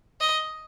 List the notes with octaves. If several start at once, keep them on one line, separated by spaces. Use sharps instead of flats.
D#5